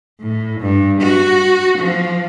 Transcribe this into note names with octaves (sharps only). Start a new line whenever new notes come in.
A2
G2
F#4
F3